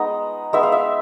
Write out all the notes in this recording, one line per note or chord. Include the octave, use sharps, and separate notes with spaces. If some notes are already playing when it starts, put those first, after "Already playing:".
Already playing: G#3 B3 D#4 D#5
G#3 B3 D#4 E5
F5
E5